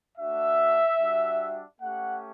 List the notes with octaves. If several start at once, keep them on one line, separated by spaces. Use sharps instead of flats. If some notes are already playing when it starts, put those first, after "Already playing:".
A3 D4 F#4 E5
G3 D4 F#4
A3 C#4 G4 F#5